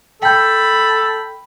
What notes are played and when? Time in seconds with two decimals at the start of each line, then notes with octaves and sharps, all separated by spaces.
0.22 A4 G5 B5 G6